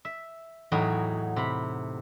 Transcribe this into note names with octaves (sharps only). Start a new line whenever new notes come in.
E5
E2 A2 F#3 D#4 F#4
C3 B5